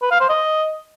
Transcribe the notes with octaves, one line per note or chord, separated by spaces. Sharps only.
B4
F5
C5
D#5